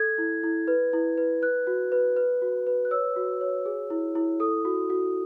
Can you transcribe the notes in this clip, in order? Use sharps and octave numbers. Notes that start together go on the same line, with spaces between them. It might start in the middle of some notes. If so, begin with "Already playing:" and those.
Already playing: A4 G#6
E4
E4
B4
E4
B4
B4 F#6
F#4
B4
B4
F#4
B4
F#6
C#5 E6
F#4
C#5
G#4
E4
E4
A4 D#6
F#4
F#4